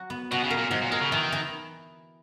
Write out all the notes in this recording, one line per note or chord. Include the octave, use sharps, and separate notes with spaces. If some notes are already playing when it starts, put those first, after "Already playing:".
Already playing: F#3 F#4
B3
B2 F#4
C#3
A#4
A#2
G#2 F#3
A#2
G#3 A#4
C#3
D#3 E3
E3